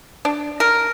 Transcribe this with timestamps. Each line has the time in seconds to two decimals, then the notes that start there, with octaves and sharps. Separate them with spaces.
0.25 D4
0.60 A#4